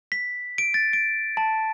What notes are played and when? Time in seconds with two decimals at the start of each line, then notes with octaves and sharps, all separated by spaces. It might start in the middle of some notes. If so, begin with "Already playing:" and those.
0.12 B6
0.58 D7
0.74 A6
0.93 D7
1.37 A5